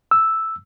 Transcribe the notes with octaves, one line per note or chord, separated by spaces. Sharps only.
E6